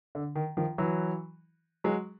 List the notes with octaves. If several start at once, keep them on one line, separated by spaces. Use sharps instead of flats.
D3
D#3
D#3 F3
E3 F#3
F#3 G#3